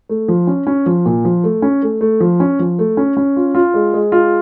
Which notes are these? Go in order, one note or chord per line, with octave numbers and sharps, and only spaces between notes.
A3
F3
C#4
C#4
F3
A#2
F3
A3
C#4
A3
A3
F3
C#4
F3
A3
C#4
C#4
F4
F4
G#3
G#3
F4